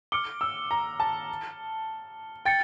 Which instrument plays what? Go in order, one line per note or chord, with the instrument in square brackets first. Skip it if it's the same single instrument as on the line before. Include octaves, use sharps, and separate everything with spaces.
[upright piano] D6 [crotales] F6 C#7 G7
[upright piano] E6
A#5
A5
[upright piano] G5 [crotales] A6 C#7